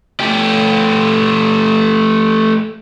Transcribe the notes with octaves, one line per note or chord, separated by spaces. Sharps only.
A3 G4